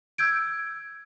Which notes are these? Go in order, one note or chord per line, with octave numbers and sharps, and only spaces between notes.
E6 G6 G#6 D7